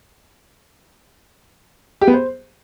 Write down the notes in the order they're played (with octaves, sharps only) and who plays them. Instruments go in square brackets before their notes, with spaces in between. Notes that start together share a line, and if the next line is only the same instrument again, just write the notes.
[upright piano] G4
B3
C5